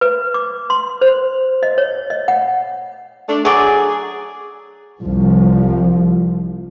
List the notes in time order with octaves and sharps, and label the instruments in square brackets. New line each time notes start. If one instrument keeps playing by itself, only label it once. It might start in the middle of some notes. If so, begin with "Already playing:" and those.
[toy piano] B4
D6
C6
C5
D#5
C#5
D#5
F#5
[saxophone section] A3 D4
[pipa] F#3 D5 [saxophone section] G#4
[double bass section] C2 F3